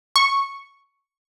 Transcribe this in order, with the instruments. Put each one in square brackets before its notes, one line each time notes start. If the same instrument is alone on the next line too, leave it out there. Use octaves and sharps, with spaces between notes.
[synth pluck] C#6